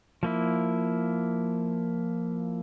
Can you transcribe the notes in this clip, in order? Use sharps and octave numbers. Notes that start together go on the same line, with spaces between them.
F3 A#3 E4